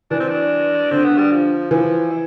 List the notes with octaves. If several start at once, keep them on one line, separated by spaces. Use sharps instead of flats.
E3 D4
C4
D4
D3 C4
B3
G3
F3
E3 F3
E4